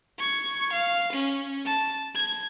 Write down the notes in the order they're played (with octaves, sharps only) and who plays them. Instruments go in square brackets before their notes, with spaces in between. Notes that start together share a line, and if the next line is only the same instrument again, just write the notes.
[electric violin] C#6 G#6
F5
C#4
A5
G#6